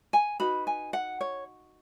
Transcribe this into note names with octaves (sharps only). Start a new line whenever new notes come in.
G#5
D#4 F#4 B4 B5
G#5
F#5
C#5